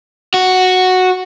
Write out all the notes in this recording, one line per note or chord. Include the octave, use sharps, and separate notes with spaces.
F#4